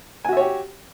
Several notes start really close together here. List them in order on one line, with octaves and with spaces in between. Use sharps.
G#5 F#4 E5 C#5 G4